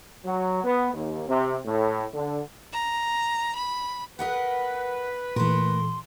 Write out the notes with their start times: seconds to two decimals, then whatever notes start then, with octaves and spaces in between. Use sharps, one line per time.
0.26 F#3
0.64 B3
0.92 D#2
1.28 C3
1.66 A2
2.14 D3
2.71 A#5
3.55 B5
4.19 A#4 B4 D#5 F#5
5.36 A#2 E3 A3 A#4 C6